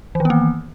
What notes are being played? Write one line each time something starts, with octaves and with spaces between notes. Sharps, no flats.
D#3 E3 A#3 B3